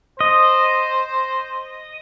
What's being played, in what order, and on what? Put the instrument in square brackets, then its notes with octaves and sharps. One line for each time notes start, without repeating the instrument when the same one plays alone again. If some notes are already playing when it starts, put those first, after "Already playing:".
[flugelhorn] C5 [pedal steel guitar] D#5